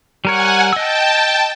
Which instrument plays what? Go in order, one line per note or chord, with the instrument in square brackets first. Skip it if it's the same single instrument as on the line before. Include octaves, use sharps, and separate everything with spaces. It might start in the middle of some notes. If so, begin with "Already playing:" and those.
[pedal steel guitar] G3 A#4 C#5 [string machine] F#5 G#5
[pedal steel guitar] D#5 E6 [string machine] G5 A5